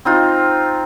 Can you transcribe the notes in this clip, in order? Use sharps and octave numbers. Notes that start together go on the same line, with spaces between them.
C4 D#4 F4